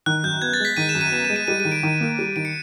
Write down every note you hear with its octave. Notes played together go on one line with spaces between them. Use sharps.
D#3 F#6
F#2 G6
B3 G#6
A6
G#3 B6
D#3 D#7
E7
F#2
D#7
B3 E7
G#3 E7
D#7
G3 D#7
D#7
D#3
D7
D#3
A#3
G3
D#3 D7
C#7